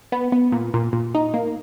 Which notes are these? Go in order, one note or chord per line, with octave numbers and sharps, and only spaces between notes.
B3
B3
A#2
A#2
A#2
D#4
A#3